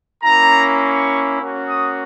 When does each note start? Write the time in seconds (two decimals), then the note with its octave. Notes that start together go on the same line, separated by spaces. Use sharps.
0.23 A#3 C#4 E4 A#5
0.81 C#6
1.39 A#3 C#4 F#4
1.68 D#6